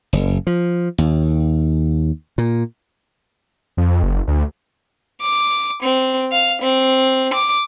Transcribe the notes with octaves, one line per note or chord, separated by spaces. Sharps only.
F#1
F3
D#2
A#2
F2
F#1
D2
D6
C4
F5
C4
D6